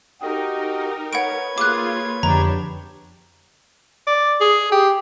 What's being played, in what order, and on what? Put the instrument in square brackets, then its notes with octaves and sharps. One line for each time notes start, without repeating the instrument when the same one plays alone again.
[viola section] D#4 A#4 [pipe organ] F#4 G4 D#5
[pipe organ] B4 C#5 G#6 [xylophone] F#5 D7
[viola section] A#3 F4 G#4 [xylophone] D6 F#6
[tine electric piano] F2 D3 F3 [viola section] B3 D4 G4 [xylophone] A#5
[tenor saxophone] D5
G#4
G4